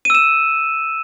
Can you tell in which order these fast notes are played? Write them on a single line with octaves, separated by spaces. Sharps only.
D#7 E6 E7